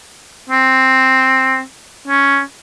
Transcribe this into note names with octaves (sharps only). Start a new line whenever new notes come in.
C4
C#4